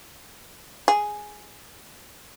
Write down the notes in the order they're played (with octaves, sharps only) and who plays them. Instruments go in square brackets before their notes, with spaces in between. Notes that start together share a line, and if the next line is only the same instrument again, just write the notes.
[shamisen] G#4